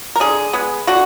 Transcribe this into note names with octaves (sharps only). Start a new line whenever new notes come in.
A#4
D3 G#4
G#3 B3
D3 F#4